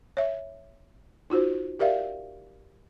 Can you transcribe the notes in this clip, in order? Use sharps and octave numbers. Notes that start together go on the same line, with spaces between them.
C#5 E5
D#4 F4 F#4 C5
G4 A#4 D5 E5 F5